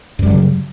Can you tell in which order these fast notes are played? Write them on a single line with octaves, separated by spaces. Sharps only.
F#2 G3 F#3 C#3